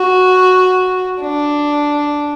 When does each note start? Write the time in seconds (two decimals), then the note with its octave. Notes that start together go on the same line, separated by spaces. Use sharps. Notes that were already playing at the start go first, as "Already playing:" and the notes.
Already playing: F#4
1.21 D4